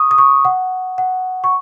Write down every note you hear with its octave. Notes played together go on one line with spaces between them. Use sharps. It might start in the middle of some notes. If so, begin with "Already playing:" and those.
Already playing: C#6 D#6
D#6
C#6
F#5
F#5
C#6